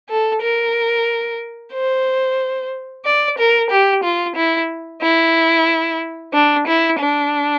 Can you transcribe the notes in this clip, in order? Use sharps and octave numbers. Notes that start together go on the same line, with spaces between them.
A4
A#4
C5
D5
A#4
G4
F4
E4
E4
D4
E4
D4